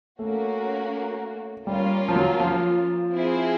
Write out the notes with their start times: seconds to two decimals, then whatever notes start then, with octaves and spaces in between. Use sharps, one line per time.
0.19 A3 A#3 C#4 F#4
1.67 G3 A#3 C#4 F4
2.09 F3
2.16 F#3
2.40 F3
3.14 C4 E4 G#4 C5